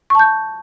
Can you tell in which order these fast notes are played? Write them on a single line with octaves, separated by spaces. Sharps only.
C#6 A5 G6